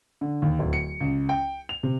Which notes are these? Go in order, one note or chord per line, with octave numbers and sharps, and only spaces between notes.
D3
D#2
D1
C#7
C#2
G5
F7
C3